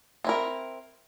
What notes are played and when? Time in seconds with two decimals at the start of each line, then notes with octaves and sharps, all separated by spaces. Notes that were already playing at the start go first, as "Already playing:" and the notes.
0.24 C4 E4 A#4